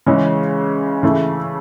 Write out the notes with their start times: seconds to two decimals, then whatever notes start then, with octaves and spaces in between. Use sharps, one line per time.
0.06 C#3 E3 G#3 C#4
1.03 C#3 E3 A3 E4